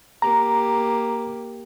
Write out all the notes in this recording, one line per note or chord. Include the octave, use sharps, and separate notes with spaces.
A#3 G4 A#5